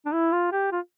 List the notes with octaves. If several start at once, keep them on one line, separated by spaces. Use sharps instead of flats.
D4
E4
F4
G4
F4